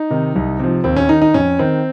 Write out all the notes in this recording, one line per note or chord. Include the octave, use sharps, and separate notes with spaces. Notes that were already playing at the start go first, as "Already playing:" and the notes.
Already playing: D#4
C3 D#3
C2
C3 F3
D#2 C4
C#4
D#3 D#4
D#4
F2 C#4
D#3 C4